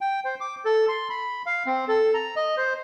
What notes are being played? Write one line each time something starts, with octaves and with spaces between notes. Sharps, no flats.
G5
C5
D6
A4
C6
B5
F5
C4
A4
A#5
D#5
C5